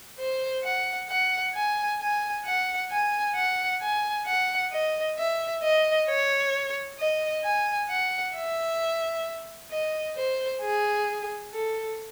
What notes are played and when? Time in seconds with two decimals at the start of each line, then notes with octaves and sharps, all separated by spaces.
0.18 C5
0.63 F#5
1.09 F#5
1.54 G#5
2.00 G#5
2.45 F#5
2.91 G#5
3.35 F#5
3.81 G#5
4.26 F#5
4.72 D#5
5.18 E5
5.63 D#5
6.09 C#5
6.99 D#5
7.44 G#5
7.89 F#5
8.35 E5
9.71 D#5
10.17 C5
10.62 G#4
11.53 A4